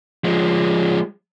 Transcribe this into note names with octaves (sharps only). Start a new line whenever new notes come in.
F3 G#3